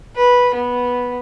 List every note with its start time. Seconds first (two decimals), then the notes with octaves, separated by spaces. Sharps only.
0.16 B4
0.54 B3